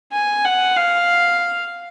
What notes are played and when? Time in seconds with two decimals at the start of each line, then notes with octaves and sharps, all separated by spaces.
0.13 G#5
0.44 F#5
0.76 F5